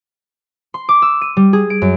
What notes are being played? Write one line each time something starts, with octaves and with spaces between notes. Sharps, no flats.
C6
D6
E6
D#7
G3
G#4
D7
F#2